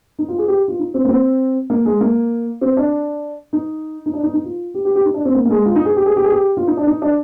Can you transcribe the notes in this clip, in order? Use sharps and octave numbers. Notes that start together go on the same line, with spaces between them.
D#4
F4
G#4
G4
F4
D#4
C4
A#3
C4
A#3
G#3
A#3
C4
D4
D#4
D#4
D4
D#4
D#4
F4
G4
G4
G4
D#4
D4
C4
A#3
A#3
G#3
F4
D#4
G#4
G4
G#4
G4
G#4
G4
F4
D#4
D4
D#4
D4